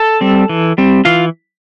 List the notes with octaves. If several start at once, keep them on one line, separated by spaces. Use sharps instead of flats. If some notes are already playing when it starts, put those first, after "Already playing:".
Already playing: A4 A5
G3 C4
E3
G3 C4
E3 F4 F5